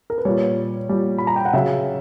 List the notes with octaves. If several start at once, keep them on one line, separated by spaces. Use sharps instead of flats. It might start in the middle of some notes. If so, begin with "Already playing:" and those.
A#4
B4
A#2 G3 C#5
A#2 G3
B5
A#5
G5
F#5
C#3 F#3 E5